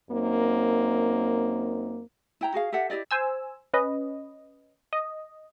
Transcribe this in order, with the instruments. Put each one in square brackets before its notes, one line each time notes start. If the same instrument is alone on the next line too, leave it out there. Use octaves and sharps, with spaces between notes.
[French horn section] F#2 A#3 C4 D#4
[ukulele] E4 G5 A#5
F#4 G#4 F5
G4 A4 E5 F#5
E4 G4 D5 D#5
[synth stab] C5 G#5 E6
C#4 B4 D#5
D#5